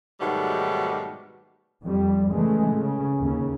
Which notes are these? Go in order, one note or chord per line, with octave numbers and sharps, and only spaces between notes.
G#2 B2 D#3 F#3 G3 A3
F2 G3
C#3 E3 G#3 A3
C#3
D#2 C#3